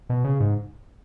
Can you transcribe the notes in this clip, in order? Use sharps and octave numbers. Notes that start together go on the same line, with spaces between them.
B2
C#3
G#2